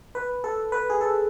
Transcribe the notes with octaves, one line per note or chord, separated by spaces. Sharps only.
B4
A4
B4
G#4
A4